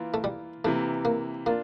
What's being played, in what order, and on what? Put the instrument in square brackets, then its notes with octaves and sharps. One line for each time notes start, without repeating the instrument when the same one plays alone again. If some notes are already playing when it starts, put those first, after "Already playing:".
Already playing: [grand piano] E3 A#3 F4
[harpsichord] A3
G3
[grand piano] C3 E3 A#3 [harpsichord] A3
[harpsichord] A#3
[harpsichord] A#3 [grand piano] D4 F4